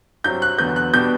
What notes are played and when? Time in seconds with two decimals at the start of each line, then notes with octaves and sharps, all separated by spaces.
0.24 G2 F#3 C4 G6
0.42 F#6
0.58 E2 D3 F#3 B3 G6
0.76 F#6
0.94 B2 G3 B3 D4 G6